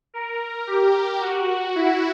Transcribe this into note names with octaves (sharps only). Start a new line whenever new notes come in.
A#4
G4
F#4
E4